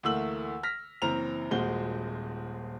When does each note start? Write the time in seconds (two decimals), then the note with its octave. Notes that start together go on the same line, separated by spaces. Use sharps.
0.03 D2 E3 A3 A#3 E6 F#7
0.63 F6 A#6 B6
1.02 F#1 E3 C4 A#5 F6 F7
1.51 D#1 A#2 G#3 F#4 C5 G7